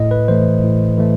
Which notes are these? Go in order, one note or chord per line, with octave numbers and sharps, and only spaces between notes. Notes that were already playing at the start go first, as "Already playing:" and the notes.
Already playing: A2 D#5
B4
E3 A3 C5
A2
E3 A3